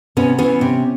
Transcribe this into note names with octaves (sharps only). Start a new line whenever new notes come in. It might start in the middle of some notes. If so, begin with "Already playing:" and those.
C3 B3 C#4
E3 B3 C#4
C3